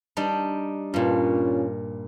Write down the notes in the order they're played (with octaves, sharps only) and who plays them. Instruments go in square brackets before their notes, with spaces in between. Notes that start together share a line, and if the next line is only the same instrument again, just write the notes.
[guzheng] G3 D4 D#4
[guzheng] G2 A#2 [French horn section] C#4 F4